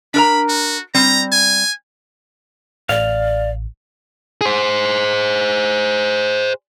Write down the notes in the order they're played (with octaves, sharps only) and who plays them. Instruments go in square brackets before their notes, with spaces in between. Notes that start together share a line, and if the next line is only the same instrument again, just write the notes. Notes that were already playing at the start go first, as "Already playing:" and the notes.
[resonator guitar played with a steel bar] D4 A#4 A#5 [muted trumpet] B5
[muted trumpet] F#4
[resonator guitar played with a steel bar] G3 C4 [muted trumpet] A#5
[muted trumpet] G#5
[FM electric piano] A1 [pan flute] D5 [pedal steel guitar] F5
[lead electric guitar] G#4 C5